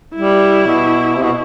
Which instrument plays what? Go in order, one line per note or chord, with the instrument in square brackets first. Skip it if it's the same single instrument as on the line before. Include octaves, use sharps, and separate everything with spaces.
[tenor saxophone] G3 [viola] E4
[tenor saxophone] B2
C3
B2